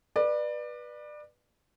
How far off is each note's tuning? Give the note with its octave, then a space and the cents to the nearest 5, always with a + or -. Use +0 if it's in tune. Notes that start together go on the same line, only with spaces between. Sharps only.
B4 -20 D5 +25